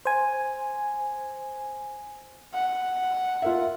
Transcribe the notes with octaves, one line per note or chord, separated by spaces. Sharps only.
C5 G#5
F#5
F4 A#4 E5